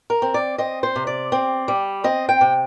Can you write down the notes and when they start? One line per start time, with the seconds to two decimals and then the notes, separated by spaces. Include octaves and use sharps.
0.10 A#4
0.22 C4
0.34 D5
0.58 C4 D#5
0.83 C5
0.96 C3
1.07 D5
1.32 C4
1.68 G3
2.04 C4 D#5
2.29 G5
2.41 C3